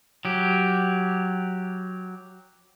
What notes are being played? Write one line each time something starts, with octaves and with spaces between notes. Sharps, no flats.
F#3 G4